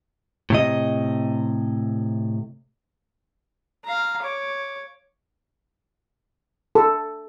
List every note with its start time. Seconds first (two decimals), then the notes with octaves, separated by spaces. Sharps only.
0.50 A2 C3 D#5
3.84 F5 A#5
4.22 C#5 D6
6.75 A4